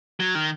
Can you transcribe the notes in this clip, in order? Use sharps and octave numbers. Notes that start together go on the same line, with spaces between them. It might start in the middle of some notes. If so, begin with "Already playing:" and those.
F#3
D#3